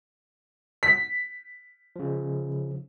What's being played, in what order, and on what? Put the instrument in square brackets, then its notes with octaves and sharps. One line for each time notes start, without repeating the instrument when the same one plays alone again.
[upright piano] B6
[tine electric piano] C#3 F3